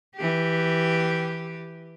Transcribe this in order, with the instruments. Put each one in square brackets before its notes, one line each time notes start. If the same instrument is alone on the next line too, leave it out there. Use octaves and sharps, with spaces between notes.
[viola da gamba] E3 G4